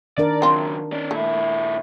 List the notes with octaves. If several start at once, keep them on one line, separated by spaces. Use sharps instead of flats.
D#3 D4 A#4 D5
C#3 F#3 C4 F4
C#4 D5
A#2 A3 E4